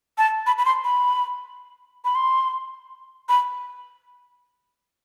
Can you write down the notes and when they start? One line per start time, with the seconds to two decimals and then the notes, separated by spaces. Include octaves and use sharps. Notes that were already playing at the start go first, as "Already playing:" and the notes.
0.18 A5
0.47 B5
0.58 B5
0.65 C6
0.84 B5
2.05 B5
2.15 C6
3.29 B5